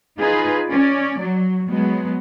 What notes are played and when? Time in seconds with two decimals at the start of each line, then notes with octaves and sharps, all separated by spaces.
0.19 D#4 F4 G#4 B4
0.67 C#4 D5
1.21 F#3
1.69 F#3 G#3 B3